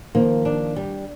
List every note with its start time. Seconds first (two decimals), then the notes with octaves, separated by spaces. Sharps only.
0.15 D#3 F3 A#3
0.45 D4
0.76 G3